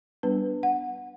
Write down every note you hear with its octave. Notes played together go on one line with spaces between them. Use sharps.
G3 B3 D4 B4
F#5